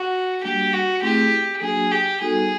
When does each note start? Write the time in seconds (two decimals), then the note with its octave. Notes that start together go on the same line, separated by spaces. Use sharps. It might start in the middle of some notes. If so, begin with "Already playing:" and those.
Already playing: F#4
0.42 G3 A#3 D4 F#4 G4
0.73 F#4
1.02 A3 C4 E4 G4 G#4
1.61 F#3 A#3 D4 F#4 G#4
1.92 G4
2.21 G3 B3 D#4 F#4 G#4 A4